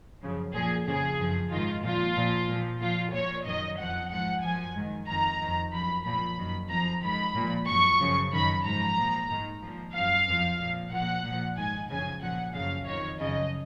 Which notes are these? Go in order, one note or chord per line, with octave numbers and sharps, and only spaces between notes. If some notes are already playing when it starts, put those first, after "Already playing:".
F#2 C#3 F3
A#2 F3 G#4
F2 C#3 F3 G#4
F#2 F3
G#2 D#3 F4
A#2 F3 F4
A#2 F3
A#2 F3
A#2 F3 F4
A#2 F3 C#5
F#2 D#3 D#5
F2 F3 F#5
G#2 F3 F#5
F#2 F3 G#5
G#2 D#3
F2 D#3 A#5
F2 D#3
F#2 F3 B5
A#2 F3 B5
F#2 D#3
F2 F3 A#5
G#2 D#3 B5
A#2 F3
F#2 F3 C#6
F#2 C#3 F3
F#2 D#3 B5
G#2 F3 A#5
A#2 F3
G#2 D#3
A#2 F3
F#2 F3 F5
F2 F3
A#2 F3
A#2 F3 F#5
A#2 F3
G#2 D#3 G#5
F#2 C#3 F3 G#5
A#2 F3 F#5
F#2 C#3 F3 F5
F2 D#3 C#5
F#2 C#3 F3 D#5